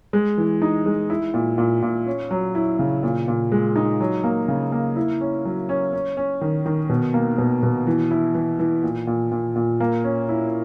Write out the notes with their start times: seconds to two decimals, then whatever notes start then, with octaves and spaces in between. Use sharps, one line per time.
0.13 G#3
0.38 E3
0.62 D#4
0.86 G#3
1.10 E4
1.34 A#2
1.58 A#2
1.82 A#2
2.07 C#4
2.31 F#3
2.55 E4
2.79 C#3
3.03 A#2
3.28 A#2
3.52 G#3
3.76 D#4
4.00 F#3
4.24 A#3
4.48 C#3
4.72 A#3
4.96 E4
5.21 C#4
5.45 F#3
5.69 C#4
5.93 C#4
6.17 C#4
6.41 D#3
6.66 D#3
6.89 B2
7.14 A#3
7.38 B2
7.63 B2
7.87 E3
8.11 E4
8.35 E3
8.59 E3
8.83 A#2
9.07 A#2
9.32 A#2
9.56 A#2
9.80 A#3
10.04 C#4
10.29 E4